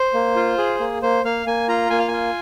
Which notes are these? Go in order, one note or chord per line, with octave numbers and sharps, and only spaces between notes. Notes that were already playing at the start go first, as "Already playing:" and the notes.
Already playing: C5
A#3
F4
G#4
A#3
A#3 C5
A#3 F5
A#3 G#5
F4 A#5
A#3 G#5
F5
F4 G#5